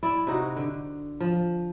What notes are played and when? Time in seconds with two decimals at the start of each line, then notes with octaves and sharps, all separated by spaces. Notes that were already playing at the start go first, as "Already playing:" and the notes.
0.03 E4 D5
0.27 C3 D#4 F#4
0.56 D3
1.20 F3